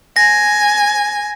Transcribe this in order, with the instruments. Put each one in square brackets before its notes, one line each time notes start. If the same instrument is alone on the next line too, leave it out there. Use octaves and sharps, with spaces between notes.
[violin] G#5 [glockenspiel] A#6